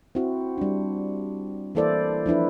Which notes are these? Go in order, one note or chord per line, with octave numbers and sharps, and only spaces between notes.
C4 E4 F#4
G3 D4
E3 A#3 E4 A4 C5 D5
F3 D4 E4 B4